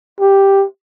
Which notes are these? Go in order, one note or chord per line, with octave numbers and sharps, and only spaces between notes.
G4